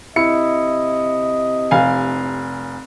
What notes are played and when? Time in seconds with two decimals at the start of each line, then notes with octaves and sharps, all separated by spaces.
0.16 C3 E4 D#5 C#7
1.71 F1 F5 G#5